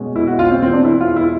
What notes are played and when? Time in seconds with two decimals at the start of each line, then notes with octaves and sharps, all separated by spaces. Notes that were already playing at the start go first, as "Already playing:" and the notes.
Already playing: B2 G#3 C#4
0.16 B2 E4
0.27 F#4
0.39 C#4 F4
0.51 C4
0.62 E2 C4
0.73 D4
0.85 E2 E4
1.00 F4
1.08 E2
1.16 E4